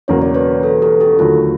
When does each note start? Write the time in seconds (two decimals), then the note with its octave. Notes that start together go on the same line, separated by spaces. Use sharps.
0.08 E1 E2 C#3 F#3 A#3 C#5
0.22 D5
0.34 B4 C#5
0.63 A4 B4
0.82 G4 A4
1.01 G4 A4
1.19 D#2 D3 F#3 A3 F4